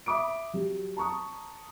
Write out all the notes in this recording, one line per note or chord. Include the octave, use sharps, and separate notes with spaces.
E5 B5 D6 D#6 D7
F#3 G4
A5 A#5 C#6 D#6